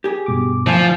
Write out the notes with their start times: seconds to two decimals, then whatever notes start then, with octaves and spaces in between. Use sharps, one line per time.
0.04 G4 G#4
0.26 G2 B2 D6
0.67 D2 F3 E5 G#5